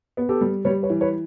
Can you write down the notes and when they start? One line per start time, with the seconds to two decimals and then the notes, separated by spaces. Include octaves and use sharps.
0.17 B3
0.29 G4 A4
0.41 G3
0.65 G3 B4 C#5
0.83 B4 C#5
0.90 E3
1.01 B4 C#5